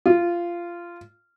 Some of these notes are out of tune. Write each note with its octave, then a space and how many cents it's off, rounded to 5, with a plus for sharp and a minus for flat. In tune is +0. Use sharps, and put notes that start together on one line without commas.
F4 -15